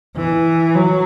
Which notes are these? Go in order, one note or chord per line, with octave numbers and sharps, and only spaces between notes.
E3
F#3